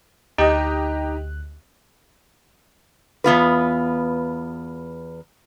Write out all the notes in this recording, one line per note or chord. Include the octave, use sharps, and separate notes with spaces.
D2 D#4 G4 D#5 F#6
E2 B3 F4 B4